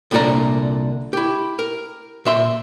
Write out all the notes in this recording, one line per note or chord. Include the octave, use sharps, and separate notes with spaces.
C2 A#2 D3 G4 D5 A#5
E4 G4
A#4
A#2 E5 C6